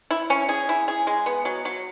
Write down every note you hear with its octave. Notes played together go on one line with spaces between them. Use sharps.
E4
C#4
G#4
E4
G#4
G#3
B3
F#3
F#3